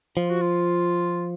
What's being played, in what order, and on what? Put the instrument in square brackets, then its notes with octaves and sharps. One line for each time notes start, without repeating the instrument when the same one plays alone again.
[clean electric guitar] F3 [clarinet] F4
[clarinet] F#4
F4